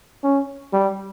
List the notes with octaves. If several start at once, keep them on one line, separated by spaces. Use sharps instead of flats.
C#4
G3